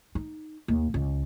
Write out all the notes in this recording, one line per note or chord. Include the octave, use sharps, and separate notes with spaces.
D#4
D#2
C#2